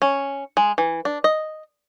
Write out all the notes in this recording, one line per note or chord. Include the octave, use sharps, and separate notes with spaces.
C#4
G#3
E3
D4
D#5